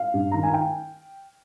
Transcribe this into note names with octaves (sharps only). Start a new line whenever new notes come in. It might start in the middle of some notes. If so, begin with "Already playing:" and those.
Already playing: F5
G2
D#3 A#5
G#5
G5